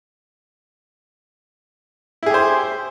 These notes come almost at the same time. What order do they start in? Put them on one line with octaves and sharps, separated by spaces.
E4 G#4 G4 C5